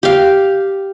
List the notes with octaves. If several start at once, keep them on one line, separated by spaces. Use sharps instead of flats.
G4 F5